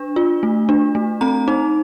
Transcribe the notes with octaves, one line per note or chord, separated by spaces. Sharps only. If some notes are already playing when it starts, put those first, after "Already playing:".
Already playing: D4
F4
A3
D4
A3
C4 A#5
D#4